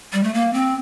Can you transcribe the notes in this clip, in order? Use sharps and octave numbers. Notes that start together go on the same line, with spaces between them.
G3
A3
A#3
C4